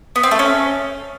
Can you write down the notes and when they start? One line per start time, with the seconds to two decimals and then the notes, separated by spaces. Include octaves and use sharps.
0.16 B3
0.23 C4
0.31 A3
0.39 C#4